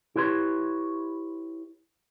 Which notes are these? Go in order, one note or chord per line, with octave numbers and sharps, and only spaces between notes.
E4 G4 B4 C#5 C6